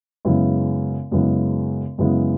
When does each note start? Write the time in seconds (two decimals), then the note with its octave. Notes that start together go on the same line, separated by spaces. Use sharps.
0.25 F#2 C#3 G#3 B3 E4
1.11 F#2 C#3 G#3 B3 E4
1.98 F#2 C#3 G#3 B3 E4